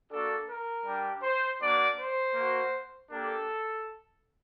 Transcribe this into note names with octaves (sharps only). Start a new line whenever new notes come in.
A#3 D4 F#4 A4
A#4
G3 D4 G4
C5
A#3 D4 F#4 D5
C5
A#3 F#4
A#3 D4 G4 A4